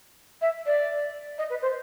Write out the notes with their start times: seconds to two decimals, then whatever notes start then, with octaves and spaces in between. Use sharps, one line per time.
0.42 E5
0.66 D5
1.38 D#5
1.50 B4
1.62 C5